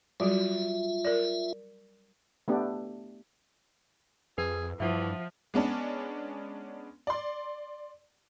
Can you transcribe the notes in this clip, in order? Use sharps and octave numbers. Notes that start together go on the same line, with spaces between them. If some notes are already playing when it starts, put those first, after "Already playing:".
F#3 G3 F4 F#4 E5
A#4 D5
A3 B3 D4 G4
F2 G#4 B4
G2 E3 F3 E5 F#5
G#3 B3 C#4 D4
D5 C6